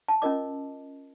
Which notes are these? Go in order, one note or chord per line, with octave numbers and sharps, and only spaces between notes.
A5
C#4 F4 A#4 D#5 D6